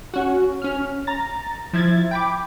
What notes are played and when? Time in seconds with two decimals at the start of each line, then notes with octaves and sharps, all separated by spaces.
0.14 C#4 F#4
0.62 C#4 F6
1.07 A#5 A6
1.73 F3 E4 G#6 A6
2.11 G5 B5 D6